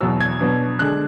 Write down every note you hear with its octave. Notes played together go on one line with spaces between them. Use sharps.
E2 B2 F#3 E6
G#6
B2 F#3 B3 D4
D3 G#3 D4 F#6